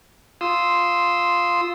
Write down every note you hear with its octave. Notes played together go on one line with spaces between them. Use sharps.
F4 C6 D#6 E6